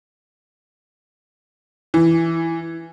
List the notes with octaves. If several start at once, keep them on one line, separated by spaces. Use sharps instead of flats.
E3